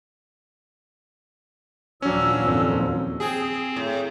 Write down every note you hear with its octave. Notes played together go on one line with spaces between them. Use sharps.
D#2 A#2 F3 F#3 C#4 D4 E6
F2 C4
C4 G#4
A2